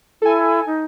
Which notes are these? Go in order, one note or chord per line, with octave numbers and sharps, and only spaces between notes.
E4 A4 G#5
D#4